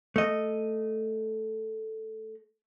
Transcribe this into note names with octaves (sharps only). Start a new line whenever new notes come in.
A3 D#5